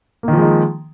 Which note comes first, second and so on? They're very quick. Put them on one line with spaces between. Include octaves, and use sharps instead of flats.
A#3 D#3 F3 G#3 D#4